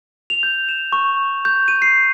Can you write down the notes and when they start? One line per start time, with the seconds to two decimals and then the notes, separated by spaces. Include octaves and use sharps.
0.30 F7
0.43 G6
0.69 E7
0.92 C#6
1.45 G6
1.68 D#7
1.82 C7